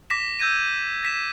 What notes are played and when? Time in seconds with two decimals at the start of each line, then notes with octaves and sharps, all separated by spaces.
0.10 D6 A#6 B6 E7
0.39 E6 G6 G#6 A#6 D#7
1.03 A#6 B6 E7